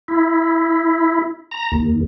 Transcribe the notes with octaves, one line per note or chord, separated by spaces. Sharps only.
E4
A#5
D#2